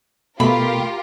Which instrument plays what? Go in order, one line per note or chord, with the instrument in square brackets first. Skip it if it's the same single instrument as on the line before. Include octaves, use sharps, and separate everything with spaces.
[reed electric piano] B2 A3 [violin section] F4 G4 A#4 [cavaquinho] B5